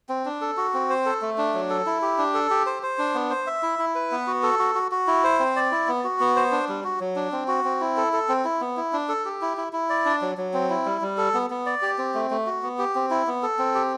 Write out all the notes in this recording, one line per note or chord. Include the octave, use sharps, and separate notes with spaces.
C4
D4
A4
F#4
C4
C5
A4
A3
D4
F#3
A4
E4
G4
D4
A4
G4
C5
C5
D4
B3
C5
E5
E4
E4
B4
B3
F#4
A4
F#4
F#4
F#4
E4
C5
C4
D5
E4
B3
F#4
B3
C5
D4
G3
F#4
F#3
D4
C4
F#4
C4
E4
A4
A4
C4
E4
B3
E4
D4
A4
G4
E4
E4
E4
D5
D4
F#3
F#3
C4
E4
G3
G3
A4
B3
B3
D5
G4
C4
A3
A3
F#4
B3
G4
C4
E4
B3
A4
C4
G4